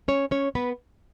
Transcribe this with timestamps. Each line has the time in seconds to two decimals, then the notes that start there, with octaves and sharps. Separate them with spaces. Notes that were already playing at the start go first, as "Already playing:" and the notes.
0.08 C#4 C#5
0.31 C#4 C#5
0.55 B3 B4